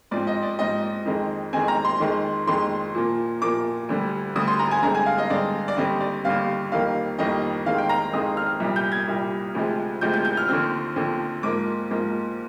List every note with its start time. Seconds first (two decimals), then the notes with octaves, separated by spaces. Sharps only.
0.11 G#2 F3 C4 D5
0.27 D#5
0.43 D5
0.59 G#2 F3 C4 D#5
1.06 F2 D#3 G#3 C4
1.53 F2 D#3 G#3 C4 G#5
1.68 A#5
1.85 C6
2.00 F2 D#3 G#3
2.47 F2 D#3 G#3 C6
2.95 A#2 F3 A#3
3.42 A#2 F3 A#3 D6
3.89 D2 D3 G3
4.36 D2 D3 G3 D#6
4.47 C6
4.59 A#5
4.71 G#5
4.83 G2 D3 G#3 C4 A#5
4.95 G#5
5.06 F5
5.18 D#5
5.30 G2 D3 G#3 C4 D5
5.68 D5
5.77 D#2 D3 G3 C4 D#5
6.01 D5
6.24 D#2 D3 G3 C4 F5
6.72 F2 D#3 G3 A#3 F5
7.19 F2 D#3 G3 A#3 D#5
7.66 F2 D#3 G#3 C4 F5
7.78 G5
7.89 A#5
8.13 F2 D#3 G#3 C4 D#6
8.37 F6
8.60 C2 A#2 G3
8.76 G6
8.92 G#6
9.08 C2 A#2 G3
9.55 D2 C3 F3 G#3
10.01 D2 C3 F3 G#3 G6
10.14 G6
10.25 G6
10.37 F6
10.49 D#2 D3 F3 C4 F6
10.96 D#2 D3 F3 C4
11.43 G#2 F3 A#3 D6
11.91 G#2 F3 A#3